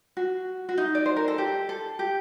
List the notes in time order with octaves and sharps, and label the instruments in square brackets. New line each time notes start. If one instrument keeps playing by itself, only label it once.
[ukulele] F#4
F#4
D#4
D5
C5
A#4
A4
G4
A4
G4